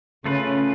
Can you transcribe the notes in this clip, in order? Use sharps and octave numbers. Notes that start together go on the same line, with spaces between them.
C#3 A3 F4 B4